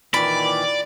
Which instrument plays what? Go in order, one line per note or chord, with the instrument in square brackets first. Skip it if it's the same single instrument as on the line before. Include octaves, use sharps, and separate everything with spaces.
[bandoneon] A#2 D#3 E3 [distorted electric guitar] D5 [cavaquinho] B5